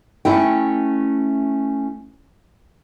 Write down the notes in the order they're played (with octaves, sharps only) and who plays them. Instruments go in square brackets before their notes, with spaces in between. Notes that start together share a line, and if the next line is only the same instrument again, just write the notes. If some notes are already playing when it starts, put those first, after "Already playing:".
[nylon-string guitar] A3 C#4 E4 G5